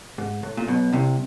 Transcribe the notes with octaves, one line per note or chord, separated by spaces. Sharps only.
G#2
A2
A#2
B1 B2
C2 C3